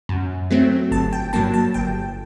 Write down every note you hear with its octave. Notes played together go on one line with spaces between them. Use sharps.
F#2
F#3 A3 C4
G1 A5
G5
G2 F#3 A#3 A5
A5
G1 G5